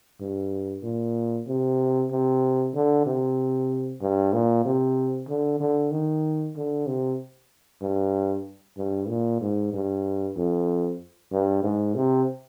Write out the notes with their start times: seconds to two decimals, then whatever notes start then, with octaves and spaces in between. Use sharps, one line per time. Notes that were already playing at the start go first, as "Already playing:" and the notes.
0.21 G2
0.83 A#2
1.47 C3
2.11 C3
2.74 D3
3.06 C3
4.01 G2
4.33 A#2
4.65 C3
5.28 D3
5.60 D3
5.91 D#3
6.56 D3
6.87 C3
7.82 G2
8.77 G2
9.09 A#2
9.41 G#2
9.73 G2
10.36 F2
11.32 G2
11.63 G#2
11.95 C3